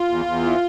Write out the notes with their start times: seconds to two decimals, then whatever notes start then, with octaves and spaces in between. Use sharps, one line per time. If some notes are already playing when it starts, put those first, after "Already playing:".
Already playing: F4
0.09 E2
0.25 E2
0.43 E3